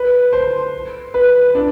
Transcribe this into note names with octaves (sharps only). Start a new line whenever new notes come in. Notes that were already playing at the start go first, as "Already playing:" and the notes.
Already playing: B4
C5
B4
D4